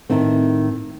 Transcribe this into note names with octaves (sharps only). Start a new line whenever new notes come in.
A2 D#3 C4